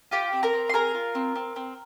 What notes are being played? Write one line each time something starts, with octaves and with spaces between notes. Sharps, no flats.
F4 G4 G5
C4
A#4 A#5
C4
C6
G#4 A#4 A#5
F4
C4
C4
C4